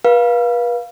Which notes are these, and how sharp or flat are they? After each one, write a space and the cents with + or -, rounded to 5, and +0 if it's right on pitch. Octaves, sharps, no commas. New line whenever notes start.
B4 -35 F5 +0